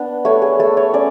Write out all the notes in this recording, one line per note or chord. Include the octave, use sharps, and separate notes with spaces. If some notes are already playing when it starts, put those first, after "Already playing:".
Already playing: B3 D4
A3 C#5
G#4
A3 A4
C#5
C#4 D5